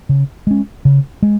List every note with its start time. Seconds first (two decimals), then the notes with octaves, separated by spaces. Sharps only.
0.09 C#3
0.47 G#3 C#4
0.85 C#3
1.23 G#3